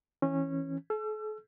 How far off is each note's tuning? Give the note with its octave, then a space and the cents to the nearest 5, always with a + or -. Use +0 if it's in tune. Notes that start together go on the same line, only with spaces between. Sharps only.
E3 -10 C#4 -20
A4 -45 E6 +35